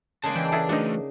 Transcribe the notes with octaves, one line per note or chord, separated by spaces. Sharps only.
C#3 G#3 A#3 D5 A5
E3 G5
E4 G#4 A4
A3 D4 D#4 F#4